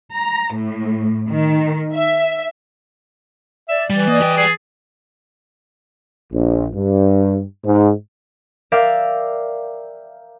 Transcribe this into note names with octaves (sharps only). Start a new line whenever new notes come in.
A#5
A2
D#3
E5
D5 E5
E3 G3
A#3 D#5
G3 G5
G#4
A#1
G2
G#2
A#4 D5 E5 F5 G5